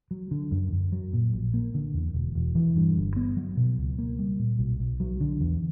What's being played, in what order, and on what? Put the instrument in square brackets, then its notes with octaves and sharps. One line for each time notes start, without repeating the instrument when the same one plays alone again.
[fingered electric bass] F#3
D3
F#2
F#2
F#3
A#2
A#1
A#3
D3
E2
E1
E1
E3
G2
G1
B3
F#3
B2
C#2
A#3
G3
A#2
B1
B1
F#3
D3
E2